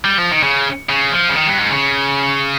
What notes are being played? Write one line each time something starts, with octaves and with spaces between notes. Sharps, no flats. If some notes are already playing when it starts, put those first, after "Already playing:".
G3
F3
D#3
C#3
C#3
F3
C#3
D#3
G2
G#2
C#3